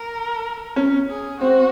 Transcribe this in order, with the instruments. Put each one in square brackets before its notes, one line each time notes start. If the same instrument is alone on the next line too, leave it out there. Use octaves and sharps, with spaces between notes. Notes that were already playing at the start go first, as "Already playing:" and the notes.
Already playing: [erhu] A#4
[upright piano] C#4
[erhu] G#4
[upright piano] C4 [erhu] F#4